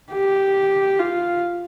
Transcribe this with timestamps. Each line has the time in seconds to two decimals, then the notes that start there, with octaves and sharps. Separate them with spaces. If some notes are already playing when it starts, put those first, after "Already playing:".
0.12 G4
0.99 F4